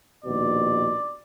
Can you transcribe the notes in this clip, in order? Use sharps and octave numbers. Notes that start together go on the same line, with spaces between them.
A#1 D#2 B2 D5